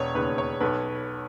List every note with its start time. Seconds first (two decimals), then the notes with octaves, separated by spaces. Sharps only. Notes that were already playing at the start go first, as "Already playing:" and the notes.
Already playing: E1 B4 C#5
0.15 D#2 C#3 B4
0.38 C#5
0.60 B1 B4